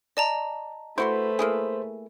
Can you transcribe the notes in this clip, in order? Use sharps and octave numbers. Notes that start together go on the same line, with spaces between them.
D5 D#5 A5 A#5
A3 E4 F#4 B4 C5 C6
A#3 E4 G#4